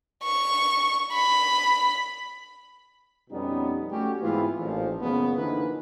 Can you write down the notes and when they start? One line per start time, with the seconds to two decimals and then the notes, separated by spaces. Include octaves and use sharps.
0.23 C#6
1.13 B5
3.30 F2 B2 G3 B3 C#4 D#4
3.90 A3 C#4 F#4 G4
4.22 G#2 E3 B3 C4 E4 F4
4.59 A1 A#2 D#3 F3
5.01 F#1 F#2 A#2 C#3 B3
5.36 D3 E3 F3 A#3 D#4 B4